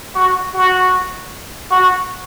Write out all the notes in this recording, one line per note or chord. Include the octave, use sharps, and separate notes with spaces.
F#4
F#4
F#4